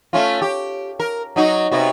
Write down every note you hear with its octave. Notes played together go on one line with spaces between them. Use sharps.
A3 C#4 F4
G4
A#4
F#3 D#4 F#4
C3 B3 F#4